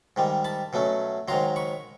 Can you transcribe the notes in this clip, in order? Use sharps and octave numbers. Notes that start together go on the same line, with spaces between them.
G#2 D#3 G3
A5 B5
B2 F#3 A3 C#4
G#2 D#3 F#3 A#5 C6
B5 C#6